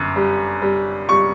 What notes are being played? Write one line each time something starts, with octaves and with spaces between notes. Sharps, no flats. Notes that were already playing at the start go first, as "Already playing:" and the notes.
Already playing: G1 F#2
G3
G3
G3 C#6